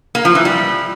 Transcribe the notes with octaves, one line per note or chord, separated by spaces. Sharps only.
A#3
F3
E3
G3